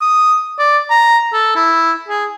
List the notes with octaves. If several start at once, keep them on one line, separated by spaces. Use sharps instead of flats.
D#6
D5
A#5
A4
E4
G#4